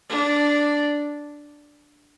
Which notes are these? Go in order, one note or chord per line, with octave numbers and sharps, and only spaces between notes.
D4